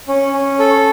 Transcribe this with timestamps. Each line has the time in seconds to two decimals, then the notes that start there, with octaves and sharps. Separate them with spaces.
0.08 C#4
0.33 C#4
0.59 A4